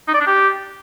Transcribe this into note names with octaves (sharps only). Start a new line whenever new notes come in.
D#4
D5
D4
G4